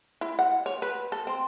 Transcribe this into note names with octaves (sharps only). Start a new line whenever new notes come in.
E4
F#5
C#5
B4
A4
C4